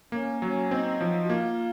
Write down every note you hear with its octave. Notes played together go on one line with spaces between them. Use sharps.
A#3 C#4
F#3 C#4
C4 D#4
F3
F#4
A#3 F4